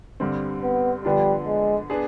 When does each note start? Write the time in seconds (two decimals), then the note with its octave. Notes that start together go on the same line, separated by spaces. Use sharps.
0.20 G2 D3 G3 C4
0.63 B3
1.05 D3 F3 G3 B3 D4
1.47 G#3
1.90 B3 D4 G#4